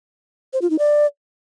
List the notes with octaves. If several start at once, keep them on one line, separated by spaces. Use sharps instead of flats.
C5
F4
D#4
D5